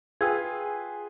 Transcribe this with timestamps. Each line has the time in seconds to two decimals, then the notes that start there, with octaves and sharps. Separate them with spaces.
0.21 F4 G#4 B4 G5 E6 G#6